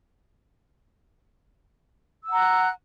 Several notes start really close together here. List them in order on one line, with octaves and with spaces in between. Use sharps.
E6 F#5 A#5 F#6